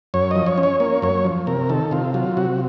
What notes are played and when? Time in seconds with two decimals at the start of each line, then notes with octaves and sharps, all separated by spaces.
0.14 F#2 C#5
0.31 F3 D#5
0.46 C#5
0.58 C#4
0.63 C#5
0.80 A#3 C#5
1.02 F#2 C#5
1.24 F3
1.47 C3 A#4
1.69 D#3 A4
1.91 C3 F4
2.14 F#3 F4
2.37 C3 F#4